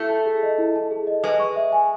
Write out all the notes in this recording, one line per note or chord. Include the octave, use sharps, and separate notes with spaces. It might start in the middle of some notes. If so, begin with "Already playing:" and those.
Already playing: A3 E4
A5
G#4
D#5
E4
A5
G#4
D#5
G#3 B4
C#6
E5
G#5